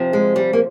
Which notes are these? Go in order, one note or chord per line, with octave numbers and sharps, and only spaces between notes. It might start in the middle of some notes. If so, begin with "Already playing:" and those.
Already playing: C3 F3
G#3
G3
A#3